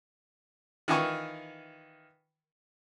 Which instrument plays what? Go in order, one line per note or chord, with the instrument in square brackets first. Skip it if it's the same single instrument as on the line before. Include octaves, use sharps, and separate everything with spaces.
[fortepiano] D#3 E3 F4 G#5 C#6